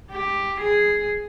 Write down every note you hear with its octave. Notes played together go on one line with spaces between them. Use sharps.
G4
G#4